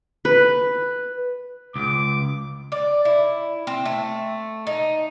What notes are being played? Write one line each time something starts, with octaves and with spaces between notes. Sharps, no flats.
B4
C#2 D6
D5
E4
C4
A3
D#4